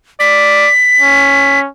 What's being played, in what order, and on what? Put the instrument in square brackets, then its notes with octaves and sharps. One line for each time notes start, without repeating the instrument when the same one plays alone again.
[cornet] D5 [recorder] B6
[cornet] C#4